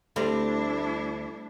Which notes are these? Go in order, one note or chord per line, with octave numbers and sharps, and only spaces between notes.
D2 G3 A3 C4 D4 E4 A#5